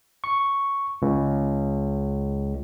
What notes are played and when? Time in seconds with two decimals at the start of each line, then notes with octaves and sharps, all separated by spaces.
0.24 C#6
1.02 C#2